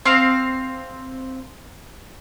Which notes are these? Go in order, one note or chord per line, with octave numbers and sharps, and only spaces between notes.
C4 F5